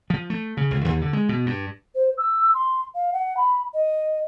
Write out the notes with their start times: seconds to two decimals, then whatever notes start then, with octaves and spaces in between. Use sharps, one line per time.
0.10 F3
0.30 A3
0.57 C#3
0.71 C#2
0.85 D#2
1.01 D3
1.13 G#3
1.29 B2
1.46 G2
1.95 C5
2.17 E6
2.54 C6
2.95 F5
3.13 F#5
3.37 B5
3.74 D#5